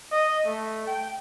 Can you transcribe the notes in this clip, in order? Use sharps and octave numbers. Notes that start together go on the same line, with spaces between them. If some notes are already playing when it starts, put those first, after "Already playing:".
D#5
A3
G5